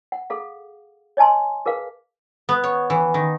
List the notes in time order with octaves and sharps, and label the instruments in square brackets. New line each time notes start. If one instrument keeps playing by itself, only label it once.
[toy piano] F#5
G#4 A4 F5
C#5 D#5 G#5 A5 C6
G#4 A#4 B4 F5
[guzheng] B3
C#5
E3
D#3